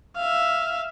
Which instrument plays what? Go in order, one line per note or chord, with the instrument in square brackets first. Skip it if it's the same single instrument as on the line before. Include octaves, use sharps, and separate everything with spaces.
[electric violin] E5 F5